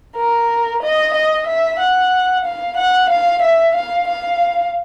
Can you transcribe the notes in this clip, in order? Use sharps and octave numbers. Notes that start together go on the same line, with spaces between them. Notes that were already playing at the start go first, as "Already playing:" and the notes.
A#4
D#5
D#5
E5
F#5
F5
F#5
F5
E5
F5
F5